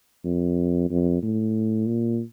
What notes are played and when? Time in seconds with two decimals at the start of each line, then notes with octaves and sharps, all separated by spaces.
0.25 F2
0.90 F2
1.23 A2
1.87 A#2